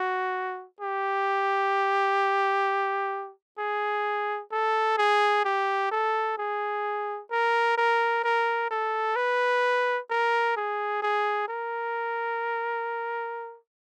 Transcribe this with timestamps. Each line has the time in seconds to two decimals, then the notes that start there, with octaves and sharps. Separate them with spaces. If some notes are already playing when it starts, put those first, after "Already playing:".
Already playing: F#4
0.81 G4
3.59 G#4
4.52 A4
4.98 G#4
5.45 G4
5.91 A4
6.38 G#4
7.31 A#4
7.78 A#4
8.24 A#4
8.71 A4
9.16 B4
10.10 A#4
10.57 G#4
11.03 G#4
11.48 A#4